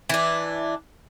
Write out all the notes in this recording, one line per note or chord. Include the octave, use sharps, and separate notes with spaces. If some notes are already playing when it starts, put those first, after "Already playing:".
E3 D4